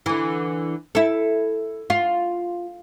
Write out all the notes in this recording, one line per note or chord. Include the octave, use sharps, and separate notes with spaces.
D3 E3
E4 A4
F4